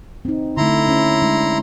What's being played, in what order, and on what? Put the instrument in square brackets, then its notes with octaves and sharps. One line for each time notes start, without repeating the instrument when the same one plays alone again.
[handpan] C4 D#4
[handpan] D3 A3 [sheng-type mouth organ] E4 A#5 C6
[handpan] C#4
G#3 D4